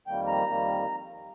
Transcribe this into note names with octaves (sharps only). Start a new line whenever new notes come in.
F2 D#3 G3 A#3 G5
A#5
F2 D#3 G3 A#3